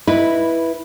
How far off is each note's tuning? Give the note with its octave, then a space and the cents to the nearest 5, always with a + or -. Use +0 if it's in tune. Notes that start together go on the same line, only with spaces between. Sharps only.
E4 +0 B4 -10 D#5 -5